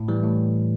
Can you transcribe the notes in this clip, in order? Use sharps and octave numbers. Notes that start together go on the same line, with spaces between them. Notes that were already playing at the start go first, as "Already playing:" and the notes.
Already playing: A2
E3 G3
A2